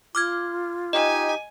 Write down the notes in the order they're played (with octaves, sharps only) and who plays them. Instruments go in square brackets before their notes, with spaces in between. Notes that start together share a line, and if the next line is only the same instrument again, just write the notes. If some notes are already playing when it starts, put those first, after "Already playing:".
[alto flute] F4 [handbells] D6 F6 G#6
[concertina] D#4 G4 [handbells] D#5 [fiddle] G#5